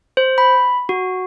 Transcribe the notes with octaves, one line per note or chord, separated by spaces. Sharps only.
C5
B5
F#4